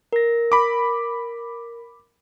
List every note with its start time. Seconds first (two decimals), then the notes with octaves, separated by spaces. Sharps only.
0.13 A#4 A#6
0.52 B5 D6